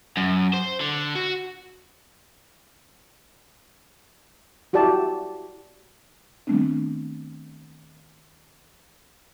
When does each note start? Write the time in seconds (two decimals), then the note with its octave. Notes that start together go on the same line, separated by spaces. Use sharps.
0.17 F#2
0.54 C5
0.81 D3
1.15 F#4
4.73 E4 F#4 G4 D5 A5
6.47 D#3 G3 A3 B3 C4 D4